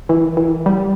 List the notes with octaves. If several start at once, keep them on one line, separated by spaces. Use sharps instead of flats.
E3
E3
G3